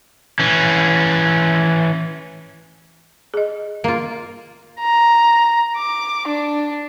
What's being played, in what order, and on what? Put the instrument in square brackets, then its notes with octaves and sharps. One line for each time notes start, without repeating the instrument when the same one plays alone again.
[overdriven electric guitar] E3 C#4
[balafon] G#4 D#5
[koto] A#3 F4
[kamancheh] A#5
D6
D4